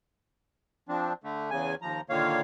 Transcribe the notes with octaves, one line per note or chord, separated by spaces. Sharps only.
F3 C4 D4
D3 A3
E2 C#3 G#5
D#2 F3 A#5
A#2 D3 D#3 A#3 C#5 F5